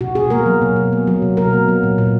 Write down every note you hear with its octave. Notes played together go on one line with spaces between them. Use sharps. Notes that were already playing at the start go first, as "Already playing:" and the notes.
B2 F#4
B2 G#4
A#3 A#4
F#3
B2
B2
A#3
F#3
B2
B2 A#4
A#3
F#3
A#2
A#2